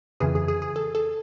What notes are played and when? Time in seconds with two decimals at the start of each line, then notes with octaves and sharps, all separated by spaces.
0.20 F2 C#3 E3 G#4
0.35 G#4
0.48 G#4
0.62 G#4
0.76 A4
0.95 A4